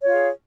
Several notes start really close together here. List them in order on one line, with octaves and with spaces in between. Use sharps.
C#5 F4 F5 G#4